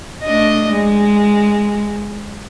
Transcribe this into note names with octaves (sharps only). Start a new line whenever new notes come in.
A3 D4 D#5
G#3